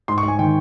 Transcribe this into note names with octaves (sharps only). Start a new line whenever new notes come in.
G#2 C6
C#6
G#2 G#5
D#3 G5